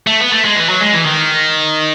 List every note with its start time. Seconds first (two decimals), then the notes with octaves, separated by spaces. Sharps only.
0.07 A3
0.20 B3
0.32 A3
0.45 G#3
0.56 E3
0.69 F#3
0.81 G#3
0.93 E3
1.05 D#3